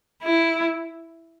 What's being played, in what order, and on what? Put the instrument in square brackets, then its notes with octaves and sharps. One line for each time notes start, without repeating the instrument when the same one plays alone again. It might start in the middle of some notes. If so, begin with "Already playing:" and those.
[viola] E4